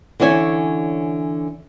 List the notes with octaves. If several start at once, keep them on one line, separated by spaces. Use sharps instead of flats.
D3 E3 C#4 C#5 E5 G#5